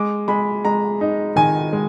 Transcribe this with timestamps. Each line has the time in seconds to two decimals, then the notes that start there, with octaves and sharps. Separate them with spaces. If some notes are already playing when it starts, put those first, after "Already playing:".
Already playing: G#3 D6
0.28 G#3 B5
0.65 G#3 A#5
1.01 D#4
1.36 D#3 G#5
1.73 G#3